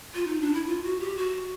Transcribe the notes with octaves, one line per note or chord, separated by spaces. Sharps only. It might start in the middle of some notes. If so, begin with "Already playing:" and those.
F4
D#4
D4
E4
F4
F#4
G4
F#4